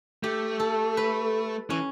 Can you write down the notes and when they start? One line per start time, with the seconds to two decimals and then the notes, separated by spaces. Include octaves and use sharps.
0.23 A3 G4
0.60 A4
0.97 B4
1.70 E3 C#4